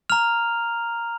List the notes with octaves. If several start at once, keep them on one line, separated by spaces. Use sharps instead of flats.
A#5 F6 F7